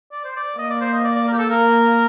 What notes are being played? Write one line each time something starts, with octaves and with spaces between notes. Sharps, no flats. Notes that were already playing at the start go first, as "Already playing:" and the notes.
D5
C5
D5
A#3 D#5
D5
C5
D#5
D5
D5
A#4
G4
A4
A#3 A#4